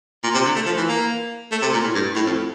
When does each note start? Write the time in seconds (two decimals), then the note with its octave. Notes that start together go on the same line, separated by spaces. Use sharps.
0.24 A#2
0.34 C3
0.45 D3
0.56 A3
0.66 F3
0.77 E3
0.88 A#3
1.52 A3
1.62 C3
1.73 A#2
1.83 A2
1.94 G2
2.15 A2
2.26 F2